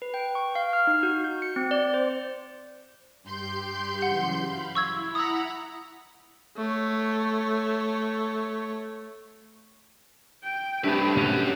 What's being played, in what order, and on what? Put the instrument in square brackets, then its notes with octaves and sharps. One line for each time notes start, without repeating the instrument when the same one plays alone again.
[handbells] B4
G5
C#6
F5
F6
D#4
F#4
G6
C#7
C4
D5
C5
[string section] G2 C6 G6 [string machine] G4
[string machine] C#3 E3 F#3 [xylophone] F#5
[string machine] F5 B5
[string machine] E4 [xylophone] C#6 E6 G#6
[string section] F#5 A#5 B5 [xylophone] D#6 E6
[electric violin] A3 C#5
[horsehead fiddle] G5
[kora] G2 E5 [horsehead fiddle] A3 G4 [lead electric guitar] C4 B4
[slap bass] A2 C3 A3 [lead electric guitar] C#4 F#4 [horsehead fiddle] G4